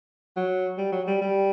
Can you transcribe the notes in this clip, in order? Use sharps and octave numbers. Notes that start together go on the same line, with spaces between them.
F#3
G3
F#3
G3
G3